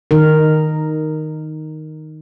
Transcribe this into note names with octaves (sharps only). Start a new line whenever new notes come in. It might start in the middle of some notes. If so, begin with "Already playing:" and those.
D#3 D#4 A#4